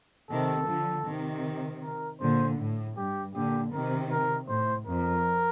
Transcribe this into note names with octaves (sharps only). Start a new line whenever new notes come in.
C3 D#3 A4
D3 F3
C3 D#3
A#4
A#2 D3 C5
A2
G2 G4
A#2 D3 G4
C3 D#3 A#4
A#4
A2 C5
F2 A#4